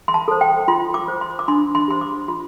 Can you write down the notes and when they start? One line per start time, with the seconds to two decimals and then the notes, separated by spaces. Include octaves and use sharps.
0.08 C6
0.14 A5
0.28 A4 C5
0.41 G5
0.68 F4 C6
0.94 D6
1.08 C5
1.21 C6
1.39 D6
1.48 D4 C6
1.75 C6
1.88 G4 C5 C6
2.01 D6
2.28 F4 C6